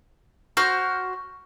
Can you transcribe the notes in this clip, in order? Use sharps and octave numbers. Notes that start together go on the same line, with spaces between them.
F#4 C5 F6 G6